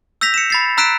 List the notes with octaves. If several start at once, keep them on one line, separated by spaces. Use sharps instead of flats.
E6 G6 A#6 B6 F7
C#7 E7
B5 A6 C7
A#5 E6 F#6 B6 D7 E7